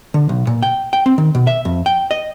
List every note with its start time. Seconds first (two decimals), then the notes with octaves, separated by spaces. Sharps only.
0.14 D3
0.29 B1
0.47 A#2
0.63 G5
0.93 G5
1.06 C4
1.18 D#3
1.35 B2
1.47 E5
1.65 F2
1.86 G5
2.11 D#5